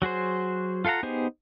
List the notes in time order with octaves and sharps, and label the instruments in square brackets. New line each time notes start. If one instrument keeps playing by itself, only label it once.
[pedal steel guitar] F#3 F#4 G#4 C5
F4 A4 F5 F#5 A#5
B3 D#4 G4 G#4 C5